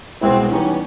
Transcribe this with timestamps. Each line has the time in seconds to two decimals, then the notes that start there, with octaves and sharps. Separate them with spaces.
0.21 C2 B2 G#3 B3 C4 E4
0.51 E3 G3 B3 C#4 D#4